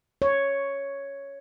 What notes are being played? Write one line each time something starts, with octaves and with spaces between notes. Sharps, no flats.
C#5